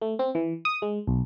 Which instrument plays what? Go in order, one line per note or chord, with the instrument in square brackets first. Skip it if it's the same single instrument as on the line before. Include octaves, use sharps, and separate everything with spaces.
[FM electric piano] A3
C4
E3
D#6
G#3
B1